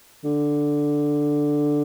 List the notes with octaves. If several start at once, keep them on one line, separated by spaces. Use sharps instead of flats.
D3